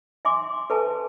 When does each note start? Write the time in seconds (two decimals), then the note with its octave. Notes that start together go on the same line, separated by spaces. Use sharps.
0.25 E5 G#5 C6 D6
0.70 A4 B4 E5 G#5 A5